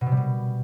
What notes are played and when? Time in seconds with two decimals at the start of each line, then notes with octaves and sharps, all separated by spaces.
0.01 B2
0.06 C3
0.12 G3
0.17 B2